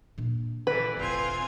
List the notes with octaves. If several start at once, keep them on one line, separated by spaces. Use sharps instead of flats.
A#2 D4
D3 E3 B4
E1 A1 C4 F4 G#5